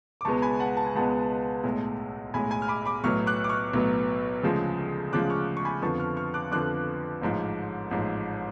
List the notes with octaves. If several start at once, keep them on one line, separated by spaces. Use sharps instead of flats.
D6
C#2 B2 G#3 B3 A5 C#6
G#5 B5
F#5 A5
A5
G#5
C#2 B2 G#3 B3 F#5 A5
B1 A2 G#3
B1 A2 G#3 G#5 B5
G#5 B5
F6
B5 D6
B5 D6
B1 A2 F#3 B3 C#6 F6
D6 F#6
D6
C#6 F6
B1 A2 F#3 B3
D2 C#3 F3 G#3
D2 C#3 F3 G#3 D6 F#6
C#6 F6
C#6
G#5 B5
F2 D3 F3 B3 A5 C#6
C#6 F6
C#6 F6
D6 F#6
F2 D3 F3 B3 D6 F#6
A1 G#2 F3
A1 G#2 F3